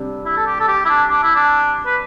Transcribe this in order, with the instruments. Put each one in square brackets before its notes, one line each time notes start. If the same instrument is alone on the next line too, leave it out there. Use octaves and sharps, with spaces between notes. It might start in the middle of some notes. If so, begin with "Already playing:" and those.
Already playing: [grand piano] C3 G3 D4
[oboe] E4
A4
G4
A4
G4
E4
D4
D4
E4
D4
B4